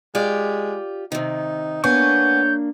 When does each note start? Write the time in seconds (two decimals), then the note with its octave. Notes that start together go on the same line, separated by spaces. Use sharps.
0.15 G#3 F4 G4 D5
1.12 C3 D#3 D#4
1.84 A#3 B3 D4 C#5 G#5 C#6 G6